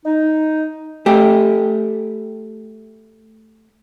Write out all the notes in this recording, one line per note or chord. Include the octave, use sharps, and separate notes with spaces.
D#4
A3 G4